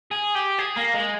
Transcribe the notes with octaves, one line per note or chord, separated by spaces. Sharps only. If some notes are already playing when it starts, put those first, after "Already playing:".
G#4
G4
G#4
A#3
G#3